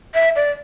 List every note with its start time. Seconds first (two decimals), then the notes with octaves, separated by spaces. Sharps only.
0.14 E5
0.36 D5